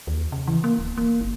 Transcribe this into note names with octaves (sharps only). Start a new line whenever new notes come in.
D#2
C#3
E3
A#3
D1
A#3
G1